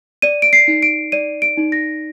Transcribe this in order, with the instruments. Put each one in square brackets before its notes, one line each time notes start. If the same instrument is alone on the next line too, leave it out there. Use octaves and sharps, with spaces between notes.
[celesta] D5 D#7
D7
C7
D#4
D7
D5 D#7
D7
D#4
A#6